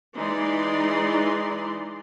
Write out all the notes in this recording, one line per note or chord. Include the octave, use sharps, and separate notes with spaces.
E3 G#3 D#4 D5 C6